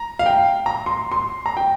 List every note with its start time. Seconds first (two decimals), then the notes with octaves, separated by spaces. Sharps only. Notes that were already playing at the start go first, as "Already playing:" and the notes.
Already playing: A#5
0.19 F5
0.26 G5
0.66 A#5
0.86 C6
1.12 C6
1.46 A#5
1.57 G5